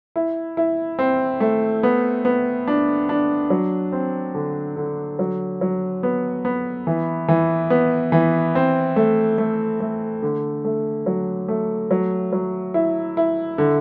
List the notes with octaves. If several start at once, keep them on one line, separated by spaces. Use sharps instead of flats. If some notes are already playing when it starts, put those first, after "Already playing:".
E4
E4
C4
A3
B3
B3
D4
D4
F#3
C4
D3
D3
F#3
F#3
B3
B3
E3
E3
B3
E3
C4
A3
A3
A3
D3
A3
F#3
A3
F#3
F#3
E4
E4
D3